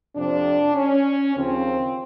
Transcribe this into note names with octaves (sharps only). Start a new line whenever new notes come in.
F2 C3 F3 D4
C#4
D#2 C#3 F3 C4